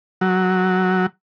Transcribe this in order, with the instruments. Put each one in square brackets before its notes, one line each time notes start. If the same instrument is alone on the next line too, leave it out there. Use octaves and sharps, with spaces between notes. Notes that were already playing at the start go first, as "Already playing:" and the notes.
[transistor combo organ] F#3